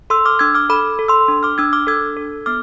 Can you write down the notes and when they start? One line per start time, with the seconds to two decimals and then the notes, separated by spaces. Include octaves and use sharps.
0.10 A4 C6 E6
0.26 D6 F6
0.39 D4 E6 G#6
0.54 D6 F6
0.69 A4 B5 D6
0.99 A4
1.08 C6 E6
1.28 D4
1.43 D6 F6
1.58 D4 E6 G#6
1.73 D6 F6
1.87 A4 E6 G#6
2.17 A4
2.46 B3 D6 F6